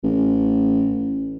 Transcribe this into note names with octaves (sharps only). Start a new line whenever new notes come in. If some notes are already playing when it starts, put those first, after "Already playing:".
A1